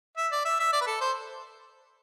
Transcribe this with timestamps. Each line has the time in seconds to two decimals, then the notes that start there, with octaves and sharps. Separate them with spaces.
0.17 E5
0.32 D5
0.45 E5
0.60 E5
0.73 D5
0.81 B4
0.87 A4
1.01 C5